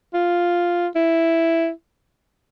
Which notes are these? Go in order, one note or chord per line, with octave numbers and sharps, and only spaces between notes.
F4
E4